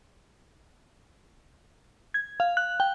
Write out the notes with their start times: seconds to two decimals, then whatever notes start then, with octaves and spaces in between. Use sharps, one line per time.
2.14 G#6
2.40 F5
2.57 F#6
2.80 G5